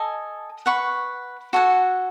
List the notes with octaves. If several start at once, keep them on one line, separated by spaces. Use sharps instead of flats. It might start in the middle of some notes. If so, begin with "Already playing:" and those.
Already playing: A4 D#5 G#5
B4 F#5 C#6
F#4 A4 C#5 F#5